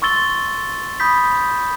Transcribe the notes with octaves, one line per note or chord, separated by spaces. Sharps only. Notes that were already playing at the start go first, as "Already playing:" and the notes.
C6 C#6 E6 A6 G7
B5 D#6 G6 B6